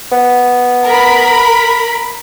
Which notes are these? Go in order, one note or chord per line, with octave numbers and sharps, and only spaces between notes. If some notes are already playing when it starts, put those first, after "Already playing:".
B3
A#4 B5